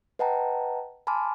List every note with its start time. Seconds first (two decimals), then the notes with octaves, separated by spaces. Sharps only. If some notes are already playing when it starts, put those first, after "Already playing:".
0.19 B4 D#5 F#5 G5 A5 A#5
1.07 G#5 A5 B5 C6 D6 F6